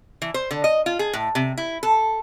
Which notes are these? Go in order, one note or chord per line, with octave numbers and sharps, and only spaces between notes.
E3
C5
D3
D#5
F4
G#4
A2
C3
E4
A4